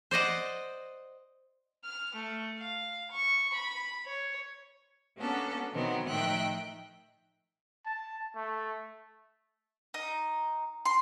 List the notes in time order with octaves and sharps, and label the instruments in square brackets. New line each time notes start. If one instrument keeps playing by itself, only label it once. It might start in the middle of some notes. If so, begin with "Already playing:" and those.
[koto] C5 D5 D#5 F#5
[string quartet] F6
A3
F5
C#6
B5
C#5
A#3 B3 C#4 D4 F#4 A4
B2 D#3 E3 F#3 B3 C4
A2 D#3 F3 E5 G5 F#6
[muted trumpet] A5
A3
[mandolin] D#4
C6